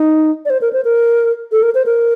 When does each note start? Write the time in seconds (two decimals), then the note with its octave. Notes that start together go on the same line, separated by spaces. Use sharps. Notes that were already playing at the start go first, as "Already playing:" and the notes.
Already playing: D#4
0.45 D5
0.50 C5
0.61 A#4
0.73 C5
0.84 A#4
1.52 A4
1.63 A#4
1.74 C5
1.86 A#4